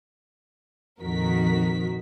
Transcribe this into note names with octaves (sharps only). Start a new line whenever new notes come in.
A#1 F2 D#3 F#4 A#4 B6